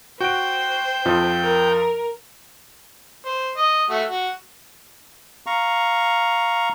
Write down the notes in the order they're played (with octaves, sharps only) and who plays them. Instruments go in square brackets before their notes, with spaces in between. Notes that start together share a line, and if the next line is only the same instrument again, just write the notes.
[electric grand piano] F#4 D7 [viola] C5 [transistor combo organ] G5
[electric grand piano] F2 F3
[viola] A#4
[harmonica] C5
D#5
A3 F#4
F#4
[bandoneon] F5 A#5 C#6